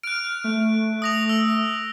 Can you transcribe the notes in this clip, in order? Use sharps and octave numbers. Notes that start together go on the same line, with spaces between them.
F6 F#6 D7
A3
D#6 A#6 F7
E6